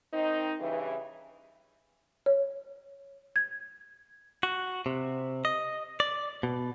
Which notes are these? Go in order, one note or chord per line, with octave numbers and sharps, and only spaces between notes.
D#3 C4 D#4
G2 C#3 E3
C#5
G#6
F#4
C3
D#5
D5
B2